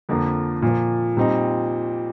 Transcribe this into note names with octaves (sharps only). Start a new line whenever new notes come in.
F2 D3 F3 A#3
A#2 F3 A#3
A#2 G3 C4 D#4